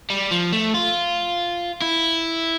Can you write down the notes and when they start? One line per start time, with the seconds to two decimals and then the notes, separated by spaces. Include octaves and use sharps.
0.10 G3
0.31 F3
0.52 A3
0.74 F4
1.82 E4